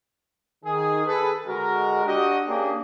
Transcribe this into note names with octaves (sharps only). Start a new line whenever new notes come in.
D#3 G#4
G#4 A4 B4
D3 G#3 F#4 A#4
D4 F#4 G4 D#5
A#3 C#4 D4 G4 G#4